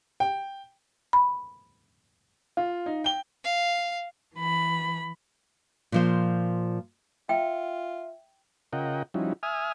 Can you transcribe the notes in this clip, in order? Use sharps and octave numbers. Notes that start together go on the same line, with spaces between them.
G5
B5
F4 F5
D#4
G5 G7
F5
E3 B5
A#2 F3 C5
F4 E5 G5
C#3 F4 A#4 D#5 F#5 G5
F3 G3 C#4 D#4 E4 F#4
E5 G#5 D#6 F6